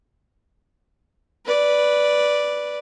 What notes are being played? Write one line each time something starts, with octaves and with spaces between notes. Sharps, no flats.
B4 D5